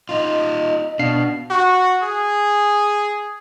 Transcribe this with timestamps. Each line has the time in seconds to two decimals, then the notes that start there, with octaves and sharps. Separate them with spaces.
0.09 D#4 F4 D#5
0.99 B2 D4 F5 C7
1.50 F#4
2.02 G#4